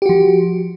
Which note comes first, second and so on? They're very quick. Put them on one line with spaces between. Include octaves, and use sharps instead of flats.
G4 F#4 F3